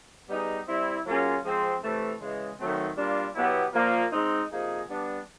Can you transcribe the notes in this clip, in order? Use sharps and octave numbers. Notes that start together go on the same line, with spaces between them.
G3 B3 D#4 G#4
G3 C4 E4
F#3 A#3 C#4 F4 G#4
F3 G#3 C4
C3 E3 A3
C#3 E3 G#3
D#3 F#3 A3 C4
G3 A#3 D4 F4
B2 F#3 B3 E4 G4
A#2 F3 A#3
G#3 C4 D#4
C3 F3 A#3 D#4 G#4
G3 B3 D4